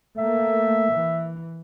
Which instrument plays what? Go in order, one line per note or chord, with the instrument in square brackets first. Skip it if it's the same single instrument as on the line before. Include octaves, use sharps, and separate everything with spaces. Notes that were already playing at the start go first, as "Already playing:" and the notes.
[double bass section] A3 A#3 [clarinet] E5
[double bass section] E3